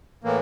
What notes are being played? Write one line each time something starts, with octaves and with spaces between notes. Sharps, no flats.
A2 E3 A#3